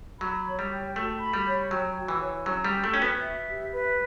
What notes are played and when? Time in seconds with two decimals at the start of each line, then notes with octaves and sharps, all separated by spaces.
0.21 F#3 B5
0.46 C#5
0.59 G3
0.71 G5
0.96 A3 F#4
1.21 B5
1.33 G3
1.46 C#5
1.71 F#3 G5
1.96 F#4
2.08 E3
2.20 C#5
2.46 F#3 C#4
2.65 G3
2.71 G5
2.84 A3
2.94 C#4 F#4
3.02 B3
3.21 E5
3.46 G4
3.71 B4